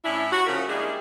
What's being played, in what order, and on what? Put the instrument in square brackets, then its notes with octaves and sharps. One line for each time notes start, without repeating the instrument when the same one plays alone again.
[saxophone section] A2 C#4 D4 E4
F#4
C#3 F3 C#4 E4 A#4
G3 G#3 A#3 D4 E4 G#4